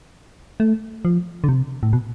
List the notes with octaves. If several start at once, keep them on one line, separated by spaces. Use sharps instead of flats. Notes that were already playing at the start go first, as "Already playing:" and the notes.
A3
F3
D3
C3
A2
B2